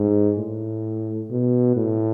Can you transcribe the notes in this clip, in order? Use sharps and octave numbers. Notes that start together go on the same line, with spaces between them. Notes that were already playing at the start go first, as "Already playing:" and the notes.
Already playing: G#2
A2
B2
A2